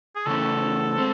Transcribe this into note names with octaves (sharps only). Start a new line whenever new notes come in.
G#4
C#3 E3 A3 C#4 E4 A4
G#3 C4